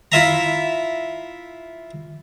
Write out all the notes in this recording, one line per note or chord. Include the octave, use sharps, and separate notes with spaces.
E4 F4 E5 A#5